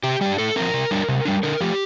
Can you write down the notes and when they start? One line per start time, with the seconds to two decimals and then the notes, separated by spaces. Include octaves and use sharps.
0.04 C3 G4
0.21 G3 D4 G4
0.38 A2 A4
0.56 F3 C4 A#4
0.74 C3
0.91 G3 D4
1.08 C3
1.25 G3 D4
1.43 D3 A#4
1.61 F3 A3 G4